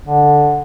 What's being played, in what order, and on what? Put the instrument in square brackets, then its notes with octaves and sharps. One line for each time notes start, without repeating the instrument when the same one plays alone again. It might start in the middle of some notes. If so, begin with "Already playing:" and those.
[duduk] D3